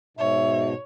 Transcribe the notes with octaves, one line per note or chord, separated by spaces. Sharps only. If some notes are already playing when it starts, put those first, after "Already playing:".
G#2 B2 C#5 E5